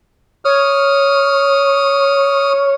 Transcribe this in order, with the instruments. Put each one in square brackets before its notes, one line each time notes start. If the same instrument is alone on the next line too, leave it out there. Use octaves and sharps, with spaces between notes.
[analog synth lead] C#5 [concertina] D#6 F6